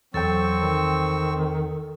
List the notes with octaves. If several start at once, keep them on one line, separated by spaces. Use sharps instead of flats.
E2 F#3 C4 A4 G5 C#6 E6
D#3